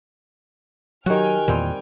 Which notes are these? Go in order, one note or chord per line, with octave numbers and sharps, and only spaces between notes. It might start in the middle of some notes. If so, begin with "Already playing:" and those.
D#3 F#3 F#4 G4 G5 G#5 F6 F#6
E2 A#2 D#3 G3 C4